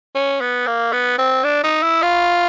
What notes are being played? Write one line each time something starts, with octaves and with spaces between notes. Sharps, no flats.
C#4
B3
A#3
B3
C4
D4
D#4
E4
F4